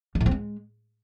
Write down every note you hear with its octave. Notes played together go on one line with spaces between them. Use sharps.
F3
A2
C4
G#3